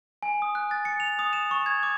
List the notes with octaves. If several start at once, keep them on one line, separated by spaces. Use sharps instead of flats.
G#5
D#6
F#6
A6
C#7
F7
D#6
E7
C#6
G#6
D6